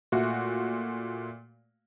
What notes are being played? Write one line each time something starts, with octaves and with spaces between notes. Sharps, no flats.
A#2 A3 F#4